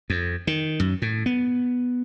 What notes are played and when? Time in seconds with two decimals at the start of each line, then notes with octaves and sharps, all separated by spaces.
0.10 F2
0.47 D#3
0.80 F#2
1.02 A2
1.26 B3